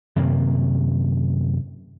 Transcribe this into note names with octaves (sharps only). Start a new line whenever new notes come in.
F#2 C3 D#3 A#3